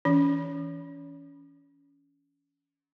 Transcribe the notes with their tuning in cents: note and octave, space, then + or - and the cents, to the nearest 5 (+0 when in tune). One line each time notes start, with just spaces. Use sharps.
E3 +0 C#4 +25